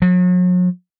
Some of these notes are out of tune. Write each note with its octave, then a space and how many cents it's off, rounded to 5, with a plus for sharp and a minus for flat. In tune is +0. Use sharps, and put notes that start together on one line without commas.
F#3 -40